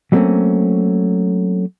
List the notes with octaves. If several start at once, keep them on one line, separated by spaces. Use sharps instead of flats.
F#3 G3 A3 A#3 C4 C#4